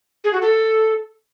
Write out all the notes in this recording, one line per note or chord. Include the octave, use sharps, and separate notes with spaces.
G#4
F#4
A4